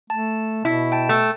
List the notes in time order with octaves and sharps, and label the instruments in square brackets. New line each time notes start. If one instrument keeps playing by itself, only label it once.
[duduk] A3 [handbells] A5
[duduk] B2 [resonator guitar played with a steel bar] E4
[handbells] G5 A5
[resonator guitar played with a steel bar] A3